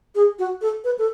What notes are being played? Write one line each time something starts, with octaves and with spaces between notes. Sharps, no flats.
G#4
F#4
A4
B4
A4